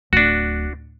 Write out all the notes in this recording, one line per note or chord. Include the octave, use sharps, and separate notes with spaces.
D1 D4 F#4